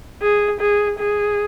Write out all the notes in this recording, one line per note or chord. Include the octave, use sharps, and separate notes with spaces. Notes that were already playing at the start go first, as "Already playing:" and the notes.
G#4
G#4
G#4